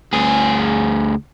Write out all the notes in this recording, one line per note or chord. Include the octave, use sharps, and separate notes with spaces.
D2 G#4